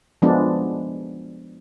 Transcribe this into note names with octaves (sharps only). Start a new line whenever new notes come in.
F3 G#3 B3 D4